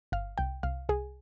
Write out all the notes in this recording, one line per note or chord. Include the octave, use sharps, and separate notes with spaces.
G1 F5
C2 G5
C2 F5
C2 G#4